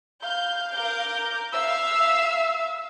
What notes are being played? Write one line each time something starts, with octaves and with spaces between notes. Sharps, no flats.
F5 G6
A#4 D6 G6
E5 F5 E6